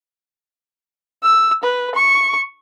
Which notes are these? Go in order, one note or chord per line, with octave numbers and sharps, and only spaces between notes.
E6
B4
C#6